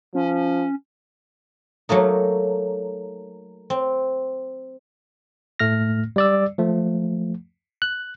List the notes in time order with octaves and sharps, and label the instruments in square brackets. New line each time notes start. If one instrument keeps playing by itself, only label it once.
[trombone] F3 [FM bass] C#4
[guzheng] F#3 A3 A#3 D#4
C4
[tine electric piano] A2 A3 F6 A#6
G3 D5 E6
F3 A3
F#6